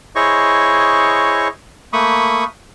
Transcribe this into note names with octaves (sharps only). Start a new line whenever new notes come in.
E4 G#4 C5 C#5 D#5 C#6
A3 A#3 B5 C#6 D#6